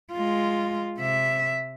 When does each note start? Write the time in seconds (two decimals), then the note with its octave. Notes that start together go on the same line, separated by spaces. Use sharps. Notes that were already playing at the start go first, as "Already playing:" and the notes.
0.12 G#3 F4
0.98 C3 E5